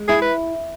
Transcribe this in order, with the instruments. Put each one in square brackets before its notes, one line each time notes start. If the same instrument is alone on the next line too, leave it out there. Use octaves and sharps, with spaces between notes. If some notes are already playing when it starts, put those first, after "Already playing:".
Already playing: [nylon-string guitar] G#3
[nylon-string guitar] E4 [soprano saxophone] G#4
[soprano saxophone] B4